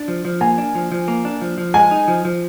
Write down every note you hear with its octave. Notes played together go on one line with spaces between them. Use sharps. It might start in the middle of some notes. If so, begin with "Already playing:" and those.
Already playing: D4
F3
F3
A#3 G#5
D4
F3
F3
A#3
D4
F3
F3
G#3 G#5
D#4
F3
F3